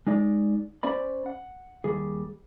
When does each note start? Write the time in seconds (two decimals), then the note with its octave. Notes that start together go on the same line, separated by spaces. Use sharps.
0.07 G#3 D#4 D5
0.83 C#4 C5 D5 B5
1.26 F#5
1.84 D#2 G3 G#4